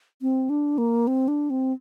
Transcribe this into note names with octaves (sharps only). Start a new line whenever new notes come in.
C4
D4
A#3
C4
D4
C4